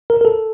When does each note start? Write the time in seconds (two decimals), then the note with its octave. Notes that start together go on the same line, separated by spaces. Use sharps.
0.10 A#4
0.21 A#4
0.25 A4